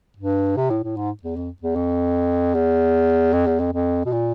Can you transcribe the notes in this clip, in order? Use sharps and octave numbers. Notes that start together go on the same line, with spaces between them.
G2
C3
A2
A2
G#2
E2
F2
E2
F2
E2
F2
E2
F2
F2
B2
A#2